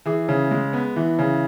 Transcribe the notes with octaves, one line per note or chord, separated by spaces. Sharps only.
E3 G#4
C#3
G#3
B3
E3
C#3